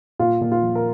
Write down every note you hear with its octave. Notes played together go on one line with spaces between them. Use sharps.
A#2 F4
A#2
F4
F3
A#4